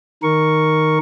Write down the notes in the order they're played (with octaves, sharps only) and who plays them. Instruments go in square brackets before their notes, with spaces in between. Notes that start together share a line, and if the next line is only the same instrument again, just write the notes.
[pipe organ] D#3 A#4 C#6